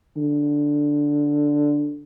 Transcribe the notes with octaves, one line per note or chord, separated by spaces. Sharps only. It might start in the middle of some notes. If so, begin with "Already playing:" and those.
D3